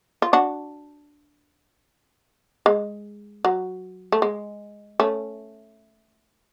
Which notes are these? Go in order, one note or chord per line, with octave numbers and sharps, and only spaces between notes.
F4
D4 F#4
G#3
F#3
A3
G#3
A3 C#4